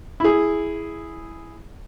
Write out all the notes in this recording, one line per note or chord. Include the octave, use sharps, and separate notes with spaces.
E4 G#4